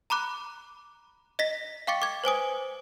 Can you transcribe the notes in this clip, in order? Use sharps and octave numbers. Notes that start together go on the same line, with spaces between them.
A#5 B5 D6 F#6
D#5 A#6 B6
F5 G5 C#6 D6 A6 C#7
D6 G#6
B4 C5 G#5 D#6